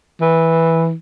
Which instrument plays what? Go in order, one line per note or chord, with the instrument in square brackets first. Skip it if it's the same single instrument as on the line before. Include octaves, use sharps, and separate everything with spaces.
[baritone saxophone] E3